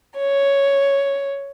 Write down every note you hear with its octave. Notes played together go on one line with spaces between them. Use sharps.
C#5